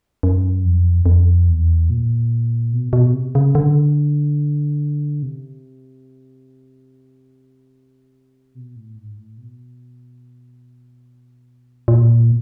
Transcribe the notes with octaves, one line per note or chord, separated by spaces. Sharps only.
F#2
F2
F2
E2
A#2
B2
B2
C3
C#3
D3
C3
B2
A2
G#2
A2
B2
A#2